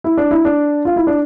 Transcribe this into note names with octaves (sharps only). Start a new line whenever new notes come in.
E4
D4
E4
D4
F4
E4
D4